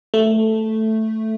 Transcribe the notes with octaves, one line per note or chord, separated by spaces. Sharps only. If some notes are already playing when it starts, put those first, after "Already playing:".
A3